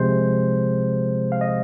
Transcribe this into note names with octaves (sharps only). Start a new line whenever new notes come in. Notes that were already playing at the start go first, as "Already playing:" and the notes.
Already playing: C3 F3 G#3 C5
F5
D#5